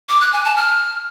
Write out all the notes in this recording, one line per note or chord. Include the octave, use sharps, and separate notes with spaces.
D6
F#6
G#5
A5
F6